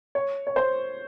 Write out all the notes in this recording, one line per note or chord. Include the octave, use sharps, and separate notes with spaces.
C#5
C#5
C5